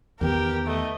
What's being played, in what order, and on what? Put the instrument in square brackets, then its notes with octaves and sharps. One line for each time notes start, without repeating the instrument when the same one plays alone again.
[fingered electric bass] E2 D#3 B3 [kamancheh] G4 A#4
[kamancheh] A3 D#5